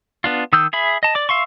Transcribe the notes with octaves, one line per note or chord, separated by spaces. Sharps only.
B3 D4 F4
D#3 D#6 E6 G6
G#4 E5 B5
D#5 A5
D5 D6
E5 F5 C6 C#6